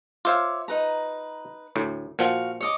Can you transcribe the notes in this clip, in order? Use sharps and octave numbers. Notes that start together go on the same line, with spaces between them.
F4 C5 C#5 E5 F5 D6
D#4 B4 A#5
D2 A2
A#2 F3 F#4 F5
C#5 D#5 D6